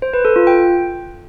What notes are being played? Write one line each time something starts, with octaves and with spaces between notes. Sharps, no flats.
C5
B4
A4
F4
G5